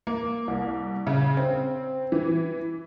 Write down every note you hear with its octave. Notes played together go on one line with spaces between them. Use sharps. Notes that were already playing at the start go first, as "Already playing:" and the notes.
A#3
C2
C#3
C4
E3